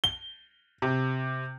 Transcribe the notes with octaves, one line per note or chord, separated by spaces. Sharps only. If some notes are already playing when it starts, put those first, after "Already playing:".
G7
C3